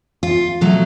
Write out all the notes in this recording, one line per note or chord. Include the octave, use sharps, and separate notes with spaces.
F4
B2 F#3 A3